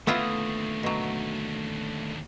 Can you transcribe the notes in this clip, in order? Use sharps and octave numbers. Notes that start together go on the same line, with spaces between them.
D#2 D3 A3 B3 E4 F4 D#6
B2 F#3